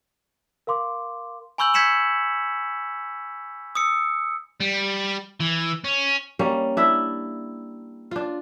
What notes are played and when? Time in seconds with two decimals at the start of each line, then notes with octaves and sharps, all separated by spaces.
0.67 A#4 F5 C6 D6
1.58 G#5 B5 C#6 E6 G6 F#7
1.74 G6 G#6 B6 C#7 E7 F#7
3.75 D#6 E6 C#7
4.60 G3
5.40 E3
5.84 C#4
6.39 G3 A#3 C#4
6.77 D4 E4 E5
8.11 D4 F4